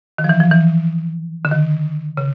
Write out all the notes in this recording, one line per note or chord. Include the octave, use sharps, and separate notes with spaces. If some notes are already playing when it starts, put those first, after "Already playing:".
D#3
F3
E3
F3
E3
D3
D#3
C#3